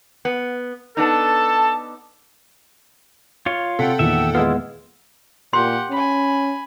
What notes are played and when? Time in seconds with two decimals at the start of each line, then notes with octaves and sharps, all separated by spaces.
0.25 B3
0.97 B3 D4 D#4 A4 A5
3.46 F4 C#5
3.79 C3 A4 F#5 G5 C6 B6
3.99 E2 A#2 D#3 E5
4.35 G#3 B3 E4 F4
5.53 A#2 G4 F#5 C6
5.91 C#4 G#5 B5